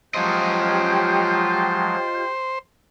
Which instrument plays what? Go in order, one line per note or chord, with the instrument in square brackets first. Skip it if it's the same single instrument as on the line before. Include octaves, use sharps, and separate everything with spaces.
[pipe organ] F3 F#3 G#3 [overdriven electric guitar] F4 D#5 [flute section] G4 G6 [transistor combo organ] C5